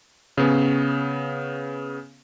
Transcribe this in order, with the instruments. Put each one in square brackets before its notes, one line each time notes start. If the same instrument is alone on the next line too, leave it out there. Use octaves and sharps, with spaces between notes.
[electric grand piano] C#3 B3 C#4